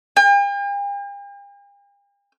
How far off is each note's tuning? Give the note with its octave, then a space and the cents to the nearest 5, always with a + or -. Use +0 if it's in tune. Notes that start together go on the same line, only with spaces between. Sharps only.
G5 +45